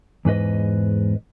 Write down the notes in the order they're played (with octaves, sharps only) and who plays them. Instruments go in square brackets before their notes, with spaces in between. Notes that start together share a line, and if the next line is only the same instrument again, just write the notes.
[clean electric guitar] E2 G#2 B4 D#5